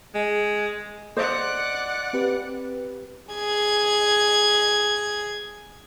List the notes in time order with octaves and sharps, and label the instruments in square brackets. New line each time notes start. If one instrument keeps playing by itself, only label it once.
[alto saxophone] G#3
[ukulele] C5 D#5 [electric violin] D5 F#5
[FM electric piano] C4 G4 B4
[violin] G#4 G#6